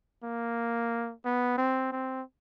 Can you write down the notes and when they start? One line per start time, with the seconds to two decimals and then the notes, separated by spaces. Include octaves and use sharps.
0.23 A#3
1.25 B3
1.58 C4
1.92 C4